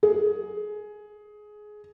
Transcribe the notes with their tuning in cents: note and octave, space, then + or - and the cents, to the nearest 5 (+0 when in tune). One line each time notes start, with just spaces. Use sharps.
G#4 +15